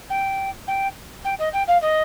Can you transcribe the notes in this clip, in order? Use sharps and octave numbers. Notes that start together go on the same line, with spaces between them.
G5
G5
G5
D#5
G5
F5
D#5